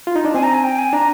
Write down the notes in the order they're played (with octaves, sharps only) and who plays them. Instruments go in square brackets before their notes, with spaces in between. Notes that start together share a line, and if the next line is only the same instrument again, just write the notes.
[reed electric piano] F4
D#4
D4
[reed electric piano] C4 [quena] G#5
[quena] A#5
G#5
G5
G#5
[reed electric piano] D4 [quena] A#5